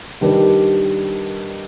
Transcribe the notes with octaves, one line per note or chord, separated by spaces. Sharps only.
D#3 G3 D4 G4 B4